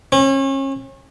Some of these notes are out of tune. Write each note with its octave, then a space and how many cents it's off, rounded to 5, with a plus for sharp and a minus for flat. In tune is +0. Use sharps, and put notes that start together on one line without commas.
C#4 -35